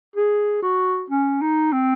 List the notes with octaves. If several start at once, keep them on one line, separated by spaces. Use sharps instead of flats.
G#4
F#4
C#4
D#4
C4